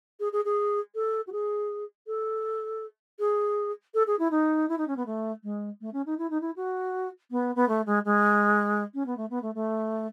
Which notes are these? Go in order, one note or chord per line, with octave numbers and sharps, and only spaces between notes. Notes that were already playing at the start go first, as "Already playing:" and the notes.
G#4
G#4
G#4
A4
F#4
G#4
A4
G#4
A4
G#4
E4
D#4
E4
D#4
C#4
B3
A3
G#3
A3
C#4
D#4
E4
D#4
E4
F#4
B3
B3
A3
G#3
G#3
C#4
B3
A3
B3
A3
A3